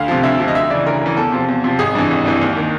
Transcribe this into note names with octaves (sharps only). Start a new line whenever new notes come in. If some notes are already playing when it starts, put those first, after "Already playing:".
Already playing: D2 F5
C3 F3
D2 E5
C3 F3
D#5
D2 E5
C#3 E3 D5
D2 A#4
C#3 E3
E2 A4
C3 F3
E2
C3 F3
G#1 G#4
G2 E3
G#1
G2 E3
D#2
D#3